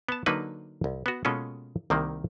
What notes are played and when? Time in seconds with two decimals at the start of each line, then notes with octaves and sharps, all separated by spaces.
0.09 B3 A5
0.26 D3 F#3 A#3 D4 D#4 B4
0.84 C2
1.06 B3 F#4
1.25 B2 G#3 A#3 C#4 F4 A4
1.90 C2 C3 D#3 G3 A#3